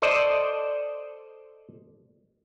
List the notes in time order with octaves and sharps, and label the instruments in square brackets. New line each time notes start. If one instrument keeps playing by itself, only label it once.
[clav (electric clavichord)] A4 C5 D5 D#5